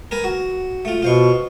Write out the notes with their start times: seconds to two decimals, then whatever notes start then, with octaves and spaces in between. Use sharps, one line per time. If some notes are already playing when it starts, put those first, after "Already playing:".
0.11 A#4 B4 G#5
0.24 F#4
0.85 A3 F4
1.02 B2 F4 C5 C#6